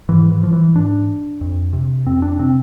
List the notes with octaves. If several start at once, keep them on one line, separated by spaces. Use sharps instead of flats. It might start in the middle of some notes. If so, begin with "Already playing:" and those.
G#2 E3
E3
F3
E3
G#2 D4
F2
C3
F2 C4
D4
C3 C4